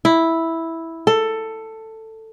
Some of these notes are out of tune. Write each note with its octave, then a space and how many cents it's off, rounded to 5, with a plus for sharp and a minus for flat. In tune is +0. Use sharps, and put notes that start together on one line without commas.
E4 -5
A4 +10